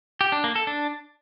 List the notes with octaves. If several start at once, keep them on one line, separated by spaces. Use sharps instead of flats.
G4
D4
A#3
A4
D4